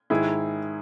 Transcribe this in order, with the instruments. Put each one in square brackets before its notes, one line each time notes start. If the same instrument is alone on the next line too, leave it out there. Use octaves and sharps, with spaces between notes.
[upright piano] G#2 D#3 E4 G#4